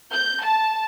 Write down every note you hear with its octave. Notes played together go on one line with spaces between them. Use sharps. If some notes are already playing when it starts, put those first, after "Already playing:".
G6
A5